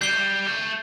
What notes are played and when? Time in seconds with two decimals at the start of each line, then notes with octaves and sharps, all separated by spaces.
0.01 G3 G6 C7 G7
0.09 A3
0.17 G3
0.47 A3